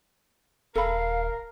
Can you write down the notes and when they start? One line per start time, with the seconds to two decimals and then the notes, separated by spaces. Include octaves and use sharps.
0.75 D#1 A4 A#4 F5 B5